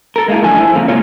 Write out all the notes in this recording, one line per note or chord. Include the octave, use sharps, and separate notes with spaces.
A4 A#4
G#3 A#3 D#4 E4
F#2 A2 D3 F3 A4 G#5
E4 C5
F2 C#3 A#3
G#2 C#3 F#3 A#3 F4 C#5